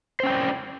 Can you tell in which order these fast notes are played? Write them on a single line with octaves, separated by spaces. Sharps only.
C5 C#4 G5 D5